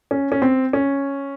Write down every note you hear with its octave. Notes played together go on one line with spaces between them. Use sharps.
C#4
C#4
C4
C#4